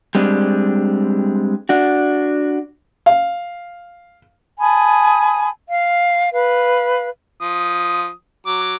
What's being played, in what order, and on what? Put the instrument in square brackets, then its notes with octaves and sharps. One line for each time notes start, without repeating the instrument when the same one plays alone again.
[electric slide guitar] G3 G#3 C4 D4
D4 F#4
[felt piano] F5
[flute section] G#5 A5 B5 D#6
F5
B4 F5
[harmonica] F3 D#6
F#3 D6